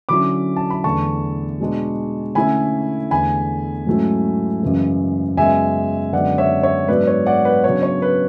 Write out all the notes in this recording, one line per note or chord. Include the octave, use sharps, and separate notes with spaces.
D3 F#3 C#4 E4 B5 D6
A5
B5
E2 D3 A3 A5 C#6
B2 G#3 D4
D3 A3 C#4 E4 G#5 B5
E2 D3 A3 G#5 B5
G#2 F#3 A3 C#4 E4
F#2 C#3 E3 G#3
F#2 C#3 G#3 B3 E5 G#5
F#2 D3 G#3 B3 D5 F#5
C#5 E5
C#5 E5
G#2 F#3 B3 D4 B4 D5
C#5
D5 F#5
B4
C#3 F#3 B3 D4 C#5
C#5
B4